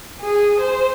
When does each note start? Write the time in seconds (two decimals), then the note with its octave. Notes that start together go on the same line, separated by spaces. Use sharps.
0.21 G#4
0.60 C5